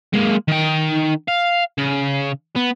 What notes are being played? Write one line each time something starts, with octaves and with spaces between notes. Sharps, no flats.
G#3 A#3
D#3 G5
F5
C#3
B3